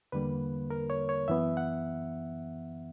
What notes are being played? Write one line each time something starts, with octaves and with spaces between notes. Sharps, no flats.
E2 D3 G3 A#3 B4
A#4
C#5
C#5
F#2 E3 B3 E5
F#5